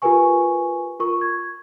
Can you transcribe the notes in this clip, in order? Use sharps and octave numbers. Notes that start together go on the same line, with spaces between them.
F4 G4 A#4 B4 G#5 C#6
F4 A#4 C#6
G#6